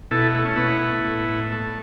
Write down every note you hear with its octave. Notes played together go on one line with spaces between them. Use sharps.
B2 E4 A4
A3 E4
C#4
B2 B3 E4
A3
A2
A2
A3